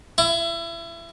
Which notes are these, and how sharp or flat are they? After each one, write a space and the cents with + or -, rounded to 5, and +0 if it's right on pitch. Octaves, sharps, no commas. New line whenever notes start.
E4 +30